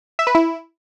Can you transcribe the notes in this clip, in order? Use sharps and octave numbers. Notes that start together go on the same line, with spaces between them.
E5
B4
E4